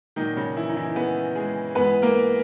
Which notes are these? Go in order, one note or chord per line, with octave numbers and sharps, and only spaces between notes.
A#2 D#3 F#3 D#4
C#3 C#4
E3 E4
D#4
E3 E4
B3
G#3 G#4
G#2 E3 G#3 B3 B4
A#3 A#4